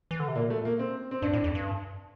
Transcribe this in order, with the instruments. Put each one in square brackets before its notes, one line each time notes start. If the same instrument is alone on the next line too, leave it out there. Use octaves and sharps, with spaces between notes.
[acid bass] E3
D3
C3
[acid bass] A#2 [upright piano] A#3
[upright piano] A3
A#3
C4
C4
[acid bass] G2 [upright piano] D4
[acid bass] A2
F2
G2